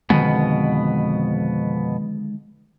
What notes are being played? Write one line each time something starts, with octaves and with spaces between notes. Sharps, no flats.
F2 B2 D3 D#3 G#3 B3